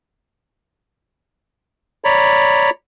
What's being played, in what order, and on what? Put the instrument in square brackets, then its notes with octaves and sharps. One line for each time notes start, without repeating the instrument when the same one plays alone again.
[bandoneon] C#5 D5 A#5 B5